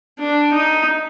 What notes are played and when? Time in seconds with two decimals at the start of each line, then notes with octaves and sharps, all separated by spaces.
0.20 D4
0.54 D#4